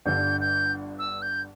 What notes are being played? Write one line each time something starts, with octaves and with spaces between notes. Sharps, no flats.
G1 G2 D3 G6
G6
E6
G6